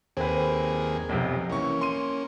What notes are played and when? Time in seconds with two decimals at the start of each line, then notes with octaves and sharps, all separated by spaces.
0.17 D#2 A#3 C4 G#4 B4
1.09 B1 F2 C3
1.49 E3 A#3 C#4 C#6
1.81 C6 D#7